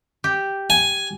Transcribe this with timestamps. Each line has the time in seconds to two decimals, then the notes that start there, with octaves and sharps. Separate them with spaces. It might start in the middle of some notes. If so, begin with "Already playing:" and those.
0.24 G4
0.70 G#5